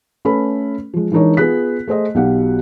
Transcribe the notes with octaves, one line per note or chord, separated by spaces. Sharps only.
A3 C#4 A4 B4 B5
F3 G#3
E3 G#3 D4 D#4 A#4 C#5
B3 F4 G#4 F#6 B6
A3 G#4 C5 D#5
B1 B2 G4 F5 F#5